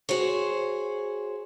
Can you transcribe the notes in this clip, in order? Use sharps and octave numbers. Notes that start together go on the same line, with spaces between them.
F#4 G#4 C5 C#5